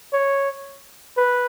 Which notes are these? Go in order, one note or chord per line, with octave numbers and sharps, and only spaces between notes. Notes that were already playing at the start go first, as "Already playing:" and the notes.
C#5
B4